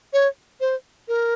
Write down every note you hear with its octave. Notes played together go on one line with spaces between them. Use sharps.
C#5
C5
A#4